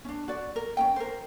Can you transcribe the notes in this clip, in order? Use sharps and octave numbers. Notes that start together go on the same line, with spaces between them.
C#4 D4
F#4 D5
A#4
C#4 D#4 G5
A#4 C5